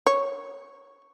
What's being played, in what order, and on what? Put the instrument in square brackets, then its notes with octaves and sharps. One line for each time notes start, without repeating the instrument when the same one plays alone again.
[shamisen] C#5